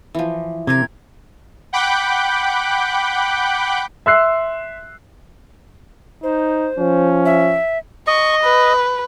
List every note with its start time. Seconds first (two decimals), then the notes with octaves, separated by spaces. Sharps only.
0.15 E3 F3
0.67 C3 C4 G4 A#4 G#6
1.73 F#5 G5 B5 D6 F#6 G6
4.06 E5 C6 E6 F#6 C7
6.23 D#4 C5
6.79 F3 C#4
7.25 E5
8.07 D#5 C#6
8.44 B4